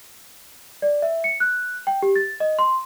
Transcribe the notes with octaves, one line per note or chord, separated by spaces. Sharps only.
D5
E5
C#7
F#6
G5
G4
A6
D#5
C6